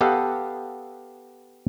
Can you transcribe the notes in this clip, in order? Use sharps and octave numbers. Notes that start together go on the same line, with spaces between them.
B3 G4 A4 D#5 F5 F#5